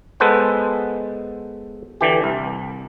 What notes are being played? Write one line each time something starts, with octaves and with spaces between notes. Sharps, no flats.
G#3 B3 A4 B4 C5 F#5
D3 E3 G4
C2